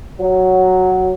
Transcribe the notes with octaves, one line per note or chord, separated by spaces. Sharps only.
F#3